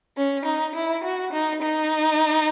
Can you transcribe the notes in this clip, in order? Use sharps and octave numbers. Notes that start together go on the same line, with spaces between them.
C#4
D#4
E4
F#4
D#4
D#4